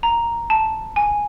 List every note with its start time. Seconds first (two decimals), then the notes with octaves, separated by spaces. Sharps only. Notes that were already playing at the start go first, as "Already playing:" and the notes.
0.03 A#5
0.50 A5
0.96 G#5